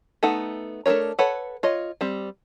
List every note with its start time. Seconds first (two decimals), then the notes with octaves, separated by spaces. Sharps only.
0.23 A3 B3 D#4 A4 F#5
0.86 A3 D4 G#4 A#4 C#5
1.19 A4 B4 C#5 F#5
1.63 F4 C#5 D#5
2.01 G3 C4